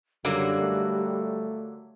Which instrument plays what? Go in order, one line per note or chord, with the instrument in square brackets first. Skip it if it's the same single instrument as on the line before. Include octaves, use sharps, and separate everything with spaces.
[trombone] F#2 [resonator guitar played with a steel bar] D3 F#3 A#3 [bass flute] G3
[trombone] A3